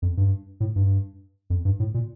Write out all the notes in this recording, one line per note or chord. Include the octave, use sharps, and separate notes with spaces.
F2
G2
A2
G2
F2
G2
A2
A#2